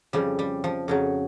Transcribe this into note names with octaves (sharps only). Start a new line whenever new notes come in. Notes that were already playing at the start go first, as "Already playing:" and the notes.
F2 C#3 F3 G3
G3
F3
F2 C#3 F3 F#3